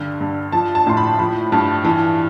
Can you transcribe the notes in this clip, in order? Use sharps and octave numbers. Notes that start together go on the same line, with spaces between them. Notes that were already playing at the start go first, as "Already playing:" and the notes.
Already playing: G2 D3
G2
F3 A5
A5
A2 C6
B5
F3 B5
G2 A5
E3